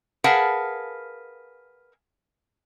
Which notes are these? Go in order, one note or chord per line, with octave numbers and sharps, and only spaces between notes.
G#4 A#4 B4 F5 F#5 A5